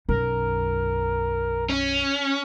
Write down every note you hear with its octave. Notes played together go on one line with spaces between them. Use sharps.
B1 F#2 A#4
C#4